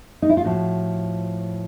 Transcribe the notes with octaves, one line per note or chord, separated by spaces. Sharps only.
D#4
E4
F4
A2 F3 F#4